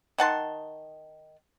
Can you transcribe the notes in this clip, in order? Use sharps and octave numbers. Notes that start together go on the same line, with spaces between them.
D#3 F#5 A5 C6